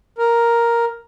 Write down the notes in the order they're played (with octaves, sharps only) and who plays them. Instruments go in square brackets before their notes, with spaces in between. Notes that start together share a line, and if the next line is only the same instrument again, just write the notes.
[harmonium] A#4